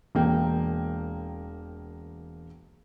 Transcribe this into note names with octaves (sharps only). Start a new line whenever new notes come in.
E1 A#3 G5